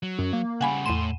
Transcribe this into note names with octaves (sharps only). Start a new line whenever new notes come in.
F#3
F#2
A#3
C#3 G3 F#5 G#5 B5
E2 A2 C6 D#7 E7